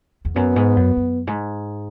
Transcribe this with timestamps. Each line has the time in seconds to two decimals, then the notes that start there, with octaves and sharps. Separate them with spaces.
0.25 E2
0.36 F#2 B3
0.56 G#2
0.76 F#2
0.97 F#2
1.27 G#2